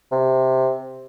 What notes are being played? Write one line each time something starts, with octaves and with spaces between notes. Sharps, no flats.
C3